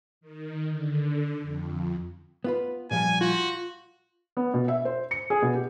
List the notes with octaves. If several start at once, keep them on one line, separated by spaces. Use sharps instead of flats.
D#3
D3
F2
B3 F4 B4
A#2 F3 G3 G#5
F4 F#4
B3
B2
E5
C5
C#7
G#4
B2
G4